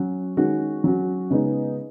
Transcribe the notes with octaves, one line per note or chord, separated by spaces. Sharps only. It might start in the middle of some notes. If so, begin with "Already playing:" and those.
Already playing: F#3 C#4 F#4
D#3 G#3 C#4 F#4
F#3 C#4 F#4
C#3 G#3 B3 D#4